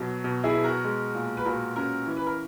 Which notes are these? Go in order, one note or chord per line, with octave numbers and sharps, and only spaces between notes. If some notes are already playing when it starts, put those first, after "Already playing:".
Already playing: B2 F#3
B2
E4 G#4
B2
F#4 A#4
G#3
A#2
B4
A#2 F#4 A#4
C#4 F#4 A#4
E3
B4
A#4